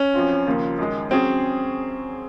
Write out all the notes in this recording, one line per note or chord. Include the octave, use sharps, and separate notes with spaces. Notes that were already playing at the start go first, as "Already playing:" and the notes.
Already playing: C#4
F#2 F3 C4 F4
D#2 C#3 F3 A#3 F4
F#2 D#3 G#3
F#3 C4 C#4 G#4